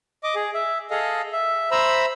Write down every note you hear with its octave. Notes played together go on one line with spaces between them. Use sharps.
D#5 D6
G#4
E5
G#4 A4 D#5 F5
E5
C5 E5 A#5 B5 E6